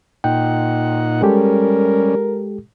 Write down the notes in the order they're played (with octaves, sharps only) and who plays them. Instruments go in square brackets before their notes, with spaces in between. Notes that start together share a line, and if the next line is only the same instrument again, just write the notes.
[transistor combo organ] A#2 D#4 F#5 [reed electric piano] G5
[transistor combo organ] G3 C#4 [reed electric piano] G#3 G4 A4 [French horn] A#4